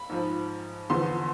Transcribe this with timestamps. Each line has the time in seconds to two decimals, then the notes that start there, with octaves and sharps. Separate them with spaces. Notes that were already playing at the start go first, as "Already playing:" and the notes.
Already playing: B5
0.09 G#2 F3
0.90 E2 D3 F3 C6